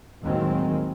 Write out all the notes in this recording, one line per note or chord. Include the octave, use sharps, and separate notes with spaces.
D#2 A2 D#3 F#3 G#3 C4